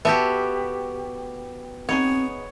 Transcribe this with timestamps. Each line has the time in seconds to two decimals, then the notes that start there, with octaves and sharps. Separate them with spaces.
0.05 B3 F#4 G4 A4 E5 A5
1.89 B3 C4 D#4 G#4 C#5